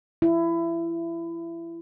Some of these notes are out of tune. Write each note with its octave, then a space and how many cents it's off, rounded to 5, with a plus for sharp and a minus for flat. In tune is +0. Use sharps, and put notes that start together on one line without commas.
E4 +25